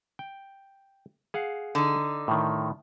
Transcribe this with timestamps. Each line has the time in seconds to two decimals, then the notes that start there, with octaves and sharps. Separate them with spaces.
0.19 G5
1.34 G#4 F5 F#5
1.75 D3 D#4
2.28 A2 D#3